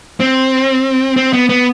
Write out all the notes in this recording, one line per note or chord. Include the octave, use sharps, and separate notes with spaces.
C4
C4
B3
B3